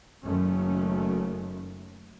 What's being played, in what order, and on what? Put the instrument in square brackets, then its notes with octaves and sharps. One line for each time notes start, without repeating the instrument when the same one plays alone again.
[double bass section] F#1 F#2 D#3 A3 C#4